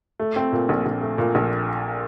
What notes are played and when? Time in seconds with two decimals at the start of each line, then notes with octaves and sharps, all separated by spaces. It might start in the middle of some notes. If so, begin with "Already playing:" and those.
0.20 A3
0.36 C4
0.52 A#2
0.69 A#1
0.86 A#1
1.01 A3
1.18 A#2
1.35 A#1